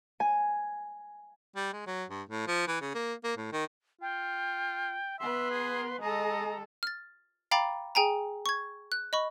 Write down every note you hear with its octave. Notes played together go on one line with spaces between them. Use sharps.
G#5
G3
G#3
F#3
G2
A2
F3
E3
C#3
A#3
A#3
A2
D#3
F4 G5
B3 B4 E5 C6
G#4
G#3 A4 D#5 A#5
F6 A6
F5 G5 A#5 B5 D6 A6
G#4 G5 G#5 A#5
C#6 G#6
F#6
D#5 B5 C#6